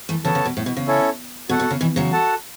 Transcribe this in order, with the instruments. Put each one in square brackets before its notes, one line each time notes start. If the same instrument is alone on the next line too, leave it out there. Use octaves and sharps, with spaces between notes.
[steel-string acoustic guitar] E3 A3
[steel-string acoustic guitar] C#3 F#3 [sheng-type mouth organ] B3 A4 C#5 A5
[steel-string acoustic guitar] C#3
B2
A2
B2
C#3
[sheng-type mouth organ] C#4 E4 A4 C#5
[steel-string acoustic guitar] B2 [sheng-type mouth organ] F#4 A4 F#5
[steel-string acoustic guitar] B2
C#3
B2 E3
C#3 F#3
[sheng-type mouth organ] F#4 A4 F#5 A5